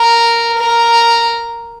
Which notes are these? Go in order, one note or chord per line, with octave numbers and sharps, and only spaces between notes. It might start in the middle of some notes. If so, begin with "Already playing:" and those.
Already playing: A#4
A#4